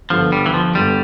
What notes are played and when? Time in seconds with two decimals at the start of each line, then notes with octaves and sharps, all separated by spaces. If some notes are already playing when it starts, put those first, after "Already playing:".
0.10 G1 G2 D3 F3
0.32 G3
0.46 E3
0.54 F3
0.75 G1 G2 D3 G3